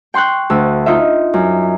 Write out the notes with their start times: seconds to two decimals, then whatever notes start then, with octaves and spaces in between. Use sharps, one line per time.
0.14 G5 C6 C#6 F#6 G6
0.50 D2 E6
0.86 D#4 F4 E5
1.34 F#2